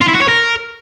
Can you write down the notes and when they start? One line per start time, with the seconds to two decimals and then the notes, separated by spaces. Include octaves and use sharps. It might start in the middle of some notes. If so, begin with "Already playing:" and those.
0.01 F4
0.08 E4
0.15 F#4
0.22 C#5
0.28 A#4